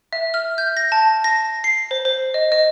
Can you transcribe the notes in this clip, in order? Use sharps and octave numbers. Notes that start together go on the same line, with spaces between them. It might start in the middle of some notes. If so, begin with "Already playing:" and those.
E5
F6
G6
A#6
A5
A#6
C7
C5
C5
D#5
D#5